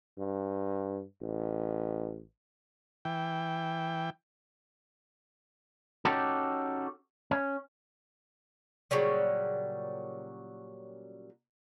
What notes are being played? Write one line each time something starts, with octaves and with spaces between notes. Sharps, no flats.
G2
A1
E3 G5
C#4 D#4 F#4 G4 A4
C#4
A#2 C#3 F#3 G3